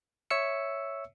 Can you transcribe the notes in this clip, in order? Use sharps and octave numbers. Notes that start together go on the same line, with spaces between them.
C#5 E5 E6 C#7